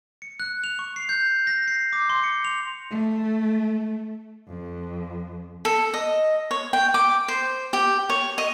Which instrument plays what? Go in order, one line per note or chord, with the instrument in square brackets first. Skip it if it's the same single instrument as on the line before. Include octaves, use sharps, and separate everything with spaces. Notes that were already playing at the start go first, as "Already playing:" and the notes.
[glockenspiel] C#7
F#6
F7
C#6
C7
G6
A#6
C7
D6
C6
C#7
F7
[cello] A3
F2
[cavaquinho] A4
D#5
C#5
G5
D6
C5
G4
C#5
D#5